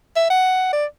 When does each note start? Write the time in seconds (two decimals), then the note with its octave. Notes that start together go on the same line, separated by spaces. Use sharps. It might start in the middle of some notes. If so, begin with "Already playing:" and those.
0.16 E5
0.30 F#5
0.73 D5